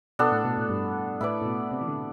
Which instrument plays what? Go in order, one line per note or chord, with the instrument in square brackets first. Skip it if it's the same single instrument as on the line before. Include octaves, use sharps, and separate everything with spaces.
[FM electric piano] B2 [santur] B3 D4 A4
[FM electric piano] A2
B2
A2
G2
[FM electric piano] A2 [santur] E4 B4 D5
[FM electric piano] A2
B2
C3
E3
D3